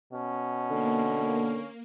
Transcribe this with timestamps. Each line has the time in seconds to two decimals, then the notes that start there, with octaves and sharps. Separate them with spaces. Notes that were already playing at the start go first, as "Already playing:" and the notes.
0.13 B2 C#4
0.71 D3 A#3